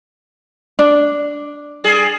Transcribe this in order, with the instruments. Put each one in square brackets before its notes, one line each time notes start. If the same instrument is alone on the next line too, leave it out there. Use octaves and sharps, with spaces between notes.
[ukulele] D4
[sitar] G3 G#4